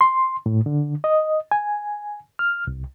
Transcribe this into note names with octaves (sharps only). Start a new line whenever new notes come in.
C6
A2
D3
D#5
G#5
F6
C2